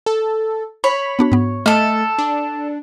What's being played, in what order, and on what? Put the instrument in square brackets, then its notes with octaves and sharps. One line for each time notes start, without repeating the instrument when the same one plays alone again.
[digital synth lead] A4
[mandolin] C#5 [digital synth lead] B5
[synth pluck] B3 D4 F#4
G#2 B3
[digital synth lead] A3 [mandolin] A4 F6 [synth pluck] D#5
[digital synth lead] D4